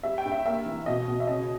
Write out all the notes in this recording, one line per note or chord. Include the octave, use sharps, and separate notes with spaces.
G3 E5
G5
G2
E5
A#3 E5
E3
B2 D#5
B2
E5
C#3 D#5